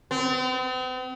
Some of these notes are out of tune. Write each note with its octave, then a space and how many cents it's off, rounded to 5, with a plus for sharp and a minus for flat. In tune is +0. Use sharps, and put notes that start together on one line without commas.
C4 -45